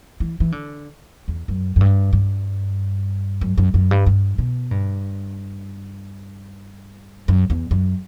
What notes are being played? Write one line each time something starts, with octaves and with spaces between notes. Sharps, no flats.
E3
E3
D3
E2
F#2
F#2
G2
G2
F#2
F#2
F#2
G2
G2
B2
G2
F#2
E2
F#2